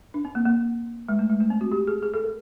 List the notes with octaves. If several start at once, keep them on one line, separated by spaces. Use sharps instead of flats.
D4
C4
A#3
A#3
G#3
A3
G#3
A3
C4
F#4
G4
G#4
G#4
A4
A#4